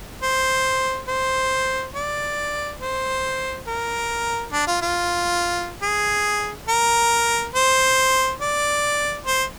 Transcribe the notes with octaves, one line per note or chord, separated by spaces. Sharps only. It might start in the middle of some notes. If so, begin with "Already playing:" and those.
C5
C5
D5
C5
A#4
D4
F4
F4
G#4
A#4
C5
D5
C5